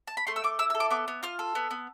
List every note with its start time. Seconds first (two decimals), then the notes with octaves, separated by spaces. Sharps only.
0.07 A5
0.17 B5
0.27 A3 C6
0.36 E6
0.44 A3 D6
0.59 E4 E6
0.70 E6
0.75 A4
0.80 D6
0.90 B3 D6
1.08 B3
1.23 F4 F6
1.39 A4
1.55 B3
1.71 B3